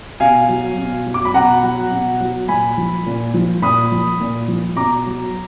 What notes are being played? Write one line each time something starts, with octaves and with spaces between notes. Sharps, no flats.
B2 F5 G#5
F#3
B2
F#3
D6
B5
B2 F#5 A#5
F#3
B2
F#3
A#2 G#5 B5
F3
A#2
F3
A#2 B5 D#6
F3
A#2
F3
B2 A#5 D6
F#3